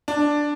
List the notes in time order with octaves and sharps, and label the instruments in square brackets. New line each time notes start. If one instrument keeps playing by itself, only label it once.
[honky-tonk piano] D4